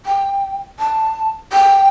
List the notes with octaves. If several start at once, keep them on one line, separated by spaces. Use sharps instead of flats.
G5
A5
G5